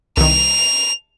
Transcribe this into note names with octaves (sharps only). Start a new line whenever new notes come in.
C2 D#3 F7